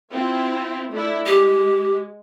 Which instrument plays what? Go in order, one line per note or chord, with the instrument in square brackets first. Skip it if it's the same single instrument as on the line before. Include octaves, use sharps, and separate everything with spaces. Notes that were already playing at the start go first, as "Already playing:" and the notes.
[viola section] C4 E4 F4
A3 D4 E4
[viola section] G#3 [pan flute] G4